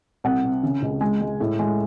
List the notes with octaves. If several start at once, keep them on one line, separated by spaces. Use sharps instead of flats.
C2 F#5
C3
C#3
C#2
G#3 G#5
G#3
A2
G#3